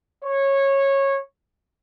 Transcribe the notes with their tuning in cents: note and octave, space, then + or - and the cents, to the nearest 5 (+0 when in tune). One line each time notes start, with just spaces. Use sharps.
C#5 -15